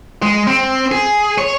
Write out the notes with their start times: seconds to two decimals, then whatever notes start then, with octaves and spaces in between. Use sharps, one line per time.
0.22 G#3
0.47 C4
0.91 G#4
1.38 C#5